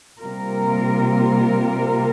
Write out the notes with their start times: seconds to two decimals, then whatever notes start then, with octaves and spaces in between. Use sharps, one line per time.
0.21 C3 G3 A#3 F4 A#4